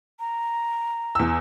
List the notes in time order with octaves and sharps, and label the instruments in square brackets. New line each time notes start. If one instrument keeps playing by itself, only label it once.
[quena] A#5
[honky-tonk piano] E2 E6